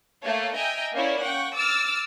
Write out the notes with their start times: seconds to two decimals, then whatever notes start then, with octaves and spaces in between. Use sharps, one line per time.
0.24 A3 A#3 A4 C#5 F5
0.56 D#5 E5 G5 G#5 A#5
0.94 A#3 C#4 E4 C#5 D5
1.22 F#5 G5 C#6
1.54 D6 E6 F6 A6